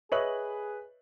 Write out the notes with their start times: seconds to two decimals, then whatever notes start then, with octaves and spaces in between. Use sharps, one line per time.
0.12 G#4 B4 C#5 D#5 E5 F#7